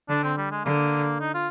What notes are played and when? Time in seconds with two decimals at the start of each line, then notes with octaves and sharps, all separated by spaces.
0.09 D3 D4
0.24 C4
0.37 G3
0.52 G#3
0.65 D3 A#3
1.20 D#4
1.34 F4